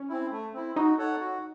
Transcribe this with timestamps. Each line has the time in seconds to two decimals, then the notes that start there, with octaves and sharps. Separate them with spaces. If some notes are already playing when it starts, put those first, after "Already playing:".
Already playing: C#4
0.09 C4 E4
0.31 A3
0.54 C4 E4
0.76 D#4 F#4
0.98 A4 C#5 F#5
1.20 F#4